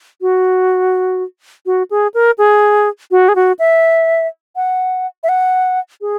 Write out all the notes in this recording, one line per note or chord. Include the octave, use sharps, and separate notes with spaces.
F#4
F#4
G#4
A#4
G#4
F#4
G#4
F#4
E5
F#5
E5
F#5
G#4